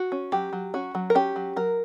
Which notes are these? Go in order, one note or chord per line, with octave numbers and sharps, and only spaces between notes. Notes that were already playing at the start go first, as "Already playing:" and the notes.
Already playing: F#4
C#4
F#3 G4
F#3
C#4 F#4
F#3
A#4
C#4 G4
F#3
F#3 A#4